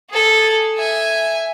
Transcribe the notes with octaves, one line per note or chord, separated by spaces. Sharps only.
G#4 A4
E5 G#5